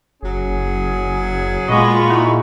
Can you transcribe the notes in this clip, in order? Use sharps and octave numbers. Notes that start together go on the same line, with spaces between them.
F#1 F#3 C#4 G#4
A#2 G#3 B3 F4 D#5 B5 C#6
D#4 E4 F#4